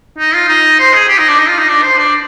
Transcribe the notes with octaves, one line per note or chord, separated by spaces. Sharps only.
D#4
F4
D#4
C5
G#4
G4
D#4
D4
D#4
F4
D#4
D4
C5
D4